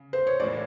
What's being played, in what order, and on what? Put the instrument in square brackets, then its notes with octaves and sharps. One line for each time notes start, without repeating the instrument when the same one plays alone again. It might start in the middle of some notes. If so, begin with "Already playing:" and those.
Already playing: [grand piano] C#3
[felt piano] C5
C#5
[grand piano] A2 E3 G3 A#3 [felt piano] D5